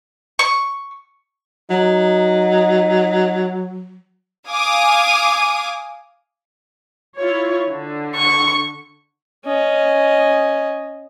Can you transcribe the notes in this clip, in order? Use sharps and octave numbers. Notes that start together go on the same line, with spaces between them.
C#6
F#3 D#4
F5 G#5 D6 D#6
E4 F4 C#5
D3
C#6
C#4 D#5